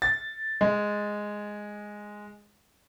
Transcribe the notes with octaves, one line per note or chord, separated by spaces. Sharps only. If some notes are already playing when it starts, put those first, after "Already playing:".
A6
G#3